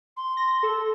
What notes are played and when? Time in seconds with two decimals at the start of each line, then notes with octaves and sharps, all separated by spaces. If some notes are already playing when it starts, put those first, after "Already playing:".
0.16 C6
0.37 A#6
0.63 A4